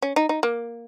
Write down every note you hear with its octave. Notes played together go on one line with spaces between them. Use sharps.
C#4
D#4
D#4
A#3